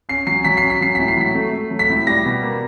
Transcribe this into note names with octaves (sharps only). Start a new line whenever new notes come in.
C#4 C7
F#3 C7
F#3 B6
C7
C#4
B6
F#3 C7
A2 B6
C7
F#3 B6
A3
A3
F#3
B6
A2
G3 A#6
B2
A#3